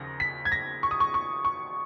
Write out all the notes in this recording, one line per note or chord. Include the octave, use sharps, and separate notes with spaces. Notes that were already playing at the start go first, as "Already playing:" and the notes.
Already playing: D#2 C#3 F3 A#6
B6
G#6
A#6
C#6
D#6
C#6
C#6
C#6